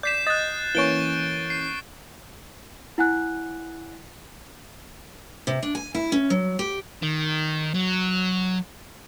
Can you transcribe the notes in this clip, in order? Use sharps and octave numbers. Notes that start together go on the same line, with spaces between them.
D5 G6 B6 C7 E7
D#5 F#6 A6
E3 A#3 C#4 C#6 D7 G7
C7
E4 F#5 G#5 F#6
C3
D4
G#5
E4
C#4
F#3
G4
D#3
F#3